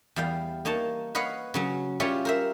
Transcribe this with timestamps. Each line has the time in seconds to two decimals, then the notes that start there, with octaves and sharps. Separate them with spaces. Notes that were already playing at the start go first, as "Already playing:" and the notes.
0.16 E2 G3 F5 G5
0.65 A#3 D#4 C#5 A5
1.15 B4 C#5 D#5 F5 F#5
1.54 C#3 F#3 C#4
2.00 G3 C#4 F4 G4 C#5 E5
2.25 A#4 C5 E5